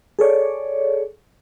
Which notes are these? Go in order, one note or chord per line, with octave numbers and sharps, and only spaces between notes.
G#4 A4 C#5 D5